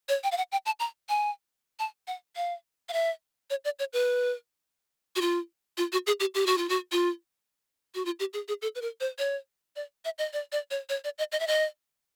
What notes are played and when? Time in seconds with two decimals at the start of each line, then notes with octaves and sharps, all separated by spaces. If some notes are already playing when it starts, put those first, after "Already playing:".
0.09 C#5
0.23 G5
0.32 F5
0.37 F#5
0.52 G5
0.66 A5
0.79 A#5
1.09 G#5
1.79 A5
2.07 F#5
2.36 F5
2.89 F5
2.93 E5
3.50 C#5
3.65 D5
3.79 C#5
3.93 B4
5.16 F#4
5.21 F4
5.77 F4
5.92 F#4
6.07 G#4
6.20 G4
6.34 G4
6.46 F#4
6.58 F4
6.69 F#4
6.92 F4
7.95 F#4
8.05 F4
8.19 G4
8.33 G#4
8.48 G#4
8.62 A4
8.75 B4
8.81 A#4
9.00 C5
9.18 C#5
9.76 D5
10.05 E5
10.18 D#5
10.33 D5
10.52 D5
10.71 C#5
10.89 C#5
11.04 D5
11.18 D#5
11.32 D#5
11.40 E5
11.47 D#5